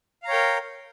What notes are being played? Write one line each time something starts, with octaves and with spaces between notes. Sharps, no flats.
A#4 C#5 F5 G5 A#5